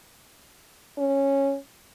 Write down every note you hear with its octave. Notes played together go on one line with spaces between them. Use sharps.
C#4